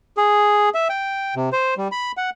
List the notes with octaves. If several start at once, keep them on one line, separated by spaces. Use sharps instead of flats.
G#4
E5
G5
C3
C5
G3
B5
F#5